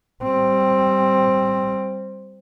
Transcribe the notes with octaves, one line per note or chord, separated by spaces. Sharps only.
G3 C4